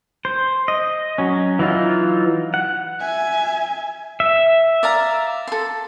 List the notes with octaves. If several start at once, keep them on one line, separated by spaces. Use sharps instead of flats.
C5
D#5
F#3 C#4
E3 F#3 D#4 F4
F#5
E5 G#5
E5
D5 F5 A#5
A4 C6